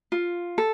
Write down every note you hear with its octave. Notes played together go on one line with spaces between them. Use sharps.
F4
A4